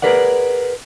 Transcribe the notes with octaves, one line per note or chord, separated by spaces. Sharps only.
G#4 A#4 B4 D5 F#5